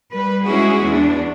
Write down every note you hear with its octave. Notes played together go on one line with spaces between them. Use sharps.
G3 B4
G#3 C#4 E4 F#4 G#4
E2 D4